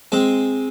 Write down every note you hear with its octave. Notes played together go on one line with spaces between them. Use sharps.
G#3 C4